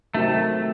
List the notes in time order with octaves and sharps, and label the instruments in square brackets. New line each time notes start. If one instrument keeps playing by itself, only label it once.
[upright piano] C3 D#3 F#3 C4 G4 [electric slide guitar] A3